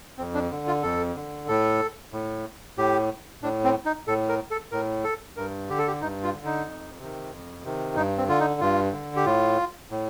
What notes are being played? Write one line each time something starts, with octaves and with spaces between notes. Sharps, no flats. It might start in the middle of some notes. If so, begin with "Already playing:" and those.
F2 C4
D4
D3
F4
F2 A4
D3
A2 A4
A2
A2 G4
A2 D4
C4
D#4
A2 A4
A#4
A4
A2 A#4
A4
G2 A#4
D3 G4
A4
G4
G2 D#4
F4
D3
D#4
F2
C3 D#3
F2
C3 D#3
G2 D#4
C4
D3 F4
D#4
G2 F4
D3
G4
A2 F4
A2